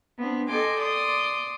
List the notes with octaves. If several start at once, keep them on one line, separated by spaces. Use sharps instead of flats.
B3 C4 D4
A4 D#5 G5 G#5 C6 D6
D5 C6 D6 D#6